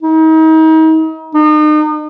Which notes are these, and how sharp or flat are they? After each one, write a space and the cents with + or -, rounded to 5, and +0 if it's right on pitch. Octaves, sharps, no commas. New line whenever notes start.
D#4 +35
D#4 -40